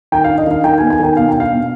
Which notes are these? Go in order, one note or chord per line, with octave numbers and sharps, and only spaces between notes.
D#3 G5
F5
D4
D#5
D#3 F5
D#3 G5
B3 G#5
G#5
D#3 G5
B2 F5
G5
D4
F5
B2